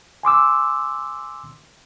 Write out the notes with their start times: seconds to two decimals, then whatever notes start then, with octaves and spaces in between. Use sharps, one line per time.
0.23 G#5 C6 D6 E6